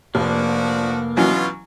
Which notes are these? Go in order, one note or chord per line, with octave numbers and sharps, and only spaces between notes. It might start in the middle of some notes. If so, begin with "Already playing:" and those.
F1 F3 A#3 D4 F#4
B2 E3 F#3 C#4 F4